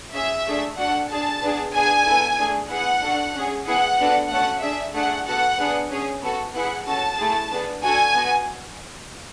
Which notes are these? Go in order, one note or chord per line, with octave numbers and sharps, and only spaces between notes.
C#4 G#4 E5
A3 D4 G#4
D4 F#4 A4 F#5
D4 G#4 A5
B3 D4 G#4
B3 D4 G#4 G#5
B3 E4 A4
A3 D4 G#4
B3 E4 G#4 F#5
D4 F#4 A4
C#4 G#4
B3 E4 G#4 F#5
B3 D4 F#4 A4
A3 C#4 F#4 A4 F#5
D4 G#4 E5
A3 D4 G#4 F#5
B3 F#4 A4 F#5
B3 D4 G#4
C#4 G#4
B3 F#4 A4
B3 E4 G#4 F#5
C#4 F#4 A4 A5
A3 E4 G#4
B3 D4 G#4
D4 F#4 A4 G#5
B3 F#4